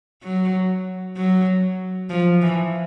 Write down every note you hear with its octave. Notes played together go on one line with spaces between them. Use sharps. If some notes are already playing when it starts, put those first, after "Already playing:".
F#3
F#3
F3
E3